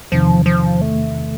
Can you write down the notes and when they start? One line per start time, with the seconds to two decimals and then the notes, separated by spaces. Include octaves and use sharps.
0.12 E2 C3 D#3 F3
0.46 F3
0.81 A3